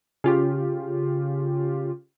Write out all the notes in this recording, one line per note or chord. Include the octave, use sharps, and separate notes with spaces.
C#3 F4 G4